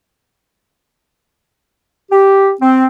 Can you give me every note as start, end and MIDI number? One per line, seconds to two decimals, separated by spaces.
2.11 2.52 67
2.61 2.86 60